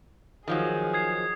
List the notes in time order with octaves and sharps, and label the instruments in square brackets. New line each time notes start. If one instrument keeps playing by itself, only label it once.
[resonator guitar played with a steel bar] D#3 F3 F#3 [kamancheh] G#4
[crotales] D#6 G#6 C7